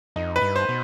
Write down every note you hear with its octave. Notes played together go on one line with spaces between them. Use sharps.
F2 D#4
B4
G2
C5
B2